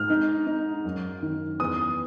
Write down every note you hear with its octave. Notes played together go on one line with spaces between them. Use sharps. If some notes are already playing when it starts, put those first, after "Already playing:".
Already playing: G#2 F6
D#4
D#4
F#2
D#3
E2 D#6